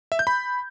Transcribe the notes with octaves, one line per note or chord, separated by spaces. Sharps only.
E5
G6
B5